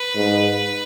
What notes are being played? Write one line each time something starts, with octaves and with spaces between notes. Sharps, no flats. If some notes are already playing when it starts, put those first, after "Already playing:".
Already playing: B4
G#2